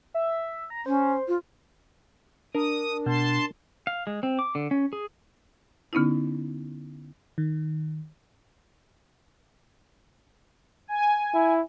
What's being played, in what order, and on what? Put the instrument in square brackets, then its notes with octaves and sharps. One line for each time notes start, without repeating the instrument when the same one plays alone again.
[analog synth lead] E5
A#5
[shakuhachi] C#4 [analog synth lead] C5
[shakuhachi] F4
[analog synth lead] D4 [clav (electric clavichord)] A#4 [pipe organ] D#6
[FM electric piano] B2 [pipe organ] A5 C6
[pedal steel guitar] F5
G#3
C4
D6
D3
C#4
G#4
[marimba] D3 B3 C#4 D#4 E4
[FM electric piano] D#3
[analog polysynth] G#5
[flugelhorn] E4